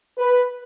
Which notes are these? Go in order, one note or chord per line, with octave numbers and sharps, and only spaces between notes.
B4